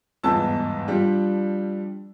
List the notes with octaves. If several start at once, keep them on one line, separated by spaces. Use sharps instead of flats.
G1 E2 G#2 A5 E6
F3 G3 D4 G4